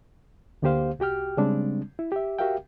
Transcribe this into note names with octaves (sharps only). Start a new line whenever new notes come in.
D2 D3 A#3 G4 C5 F5
C2 F#4 G4 G5 F6
C#3 G3 G#3 C4 D4
E4
G4 E5
F#4 G4 A#4 E5 F5 G5